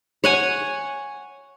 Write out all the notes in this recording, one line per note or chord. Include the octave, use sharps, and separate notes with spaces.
C#5 F#5 G#5